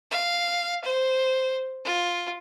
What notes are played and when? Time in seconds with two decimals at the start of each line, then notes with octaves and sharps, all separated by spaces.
0.11 F5
0.84 C5
1.85 F4